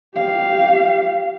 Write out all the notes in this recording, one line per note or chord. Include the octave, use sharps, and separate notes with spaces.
G4 F5